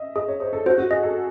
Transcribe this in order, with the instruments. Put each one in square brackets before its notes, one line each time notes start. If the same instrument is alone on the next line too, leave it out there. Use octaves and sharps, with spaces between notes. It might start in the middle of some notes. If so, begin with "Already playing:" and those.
Already playing: [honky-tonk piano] D#5 E5
[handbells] G#4 [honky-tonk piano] D#5
[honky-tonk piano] C#5
[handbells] G#4 [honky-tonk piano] C5
[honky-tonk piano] A4
[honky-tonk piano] F#4 [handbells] C5
[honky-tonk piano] F#4
[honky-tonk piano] G#4 [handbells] D#5
[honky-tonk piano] A4